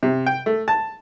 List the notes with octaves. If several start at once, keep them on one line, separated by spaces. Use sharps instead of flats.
C3
G5
A3
A5